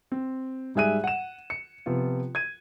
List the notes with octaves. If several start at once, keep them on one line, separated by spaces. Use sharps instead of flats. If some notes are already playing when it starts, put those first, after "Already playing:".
C4
G#2 G3 G#4 E5 F#6 D#7
F#5 E7
C#7
C3 F3 B3 F4
G#6 D#7